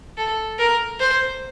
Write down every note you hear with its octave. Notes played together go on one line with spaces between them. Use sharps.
A4
A#4
C5